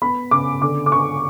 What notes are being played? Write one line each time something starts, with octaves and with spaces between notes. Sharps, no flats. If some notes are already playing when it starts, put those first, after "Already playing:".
B3 B5
C#3 D6
D3 D6
D6
D3 C#6